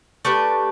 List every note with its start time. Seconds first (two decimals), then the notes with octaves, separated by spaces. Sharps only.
0.25 A3 D4 G4 B4